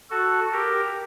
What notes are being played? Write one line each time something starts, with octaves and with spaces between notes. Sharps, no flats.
F#4 A4
G4 A#4